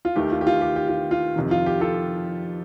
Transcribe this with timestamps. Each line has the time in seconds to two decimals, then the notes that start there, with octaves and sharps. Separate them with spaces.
0.05 F4
0.16 D#2 D#3 A3 G4
0.32 F4
0.41 G4
0.47 F4
0.61 G4
0.76 G4
0.88 F4
1.11 F4
1.36 F2 C3 D#3
1.51 F4
1.66 G4
1.81 F4 A4